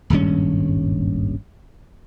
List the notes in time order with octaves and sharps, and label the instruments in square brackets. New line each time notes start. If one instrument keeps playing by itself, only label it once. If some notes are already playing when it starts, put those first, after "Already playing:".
[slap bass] D#1 G#1 G2 C#4